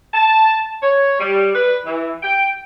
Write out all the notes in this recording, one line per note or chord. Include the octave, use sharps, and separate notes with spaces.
A5
C#5
G3
B4
E3
G5